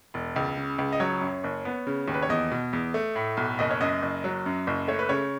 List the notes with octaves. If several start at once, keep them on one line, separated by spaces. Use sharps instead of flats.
E1
C#2
C#3
C#2
D#5
F#3 C#5
F#2
F#1
B3
C#3
D#2
B4
C#5
E2 D#5
B2
E2
A3
A2
B1
F#1 D#5
C#5
F#2 D#5
F#1
F#3
F#2
F#1
A3 C#5
B4
C#3 C#5